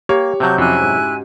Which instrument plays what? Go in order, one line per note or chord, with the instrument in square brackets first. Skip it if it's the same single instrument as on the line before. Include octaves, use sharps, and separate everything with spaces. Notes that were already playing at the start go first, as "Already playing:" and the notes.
[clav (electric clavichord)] A#3 [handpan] G4 [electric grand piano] C#5
[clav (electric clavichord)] C3 F#3 [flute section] A5 C#6 G6
[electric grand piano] F2 G4 [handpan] C#4 F#4 [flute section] E4 G#5 F#6
[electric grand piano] G#2